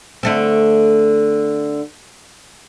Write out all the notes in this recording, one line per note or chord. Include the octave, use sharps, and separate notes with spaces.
D3 A3 C4